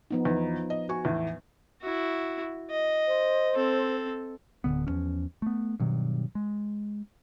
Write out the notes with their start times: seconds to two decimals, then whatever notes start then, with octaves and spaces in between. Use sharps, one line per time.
0.11 F3 B3 D#4
0.25 E2 F3 D#4
0.70 D#5
0.89 F#4 G#5 C#6
1.05 E2 A2 E3
1.82 E4 F#4
2.71 D#5
3.08 C5
3.55 C4 A4
4.64 D1 D#2 D3 B3
4.87 E2 F3 C#4
5.42 A3 B3
5.80 G2 B2 D#3 F#3
6.35 G#3